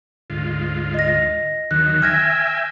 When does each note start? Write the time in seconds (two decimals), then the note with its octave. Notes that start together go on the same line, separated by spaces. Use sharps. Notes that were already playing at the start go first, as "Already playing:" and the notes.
0.30 D2 G#2 F4
0.94 D#5 A#6
1.71 D#2 D#3 F#3 F#6
2.02 E5 G5 G#5 F6 G#6 A#6